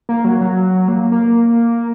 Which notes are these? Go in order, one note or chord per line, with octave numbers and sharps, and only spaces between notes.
A#3
F#3
F#3
A#3
A#3